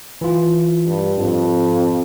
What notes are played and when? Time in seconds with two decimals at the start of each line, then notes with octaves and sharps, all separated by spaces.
0.21 E3 F4
0.86 G2
1.17 F2 G#2